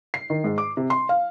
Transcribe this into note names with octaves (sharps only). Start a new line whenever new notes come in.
C7
D#3
G#2
D6
C3
C6
F5